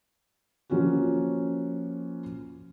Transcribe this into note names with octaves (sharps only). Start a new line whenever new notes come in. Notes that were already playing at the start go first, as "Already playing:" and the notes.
F3 A#3 C#4 F4 F#4